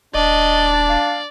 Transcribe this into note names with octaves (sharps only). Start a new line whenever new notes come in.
D#1 D4 D5 D#5
F5